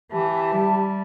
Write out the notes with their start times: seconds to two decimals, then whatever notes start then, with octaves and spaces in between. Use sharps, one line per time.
0.11 E3 G4 E5 A5
0.52 G3